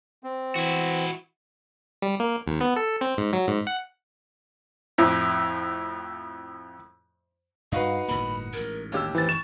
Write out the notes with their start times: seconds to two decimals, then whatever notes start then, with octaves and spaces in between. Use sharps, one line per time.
0.24 C4
0.56 E3 E4 F#4
2.02 G3
2.20 A#3
2.47 D#2
2.61 B3
2.76 A4
3.01 C4
3.17 G#2
3.33 F#3
3.48 G#2
3.67 F#5
4.98 F2 A2
7.72 G2 D#4 F#4 B4 F5
8.08 G1 A2 A#3 B5
8.53 A1 G#2 A#4
8.92 D#2 G4 C#5 E6
9.15 E3 C5 A6
9.29 C#6 E7